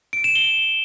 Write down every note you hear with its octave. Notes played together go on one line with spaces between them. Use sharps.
D7
E7
G7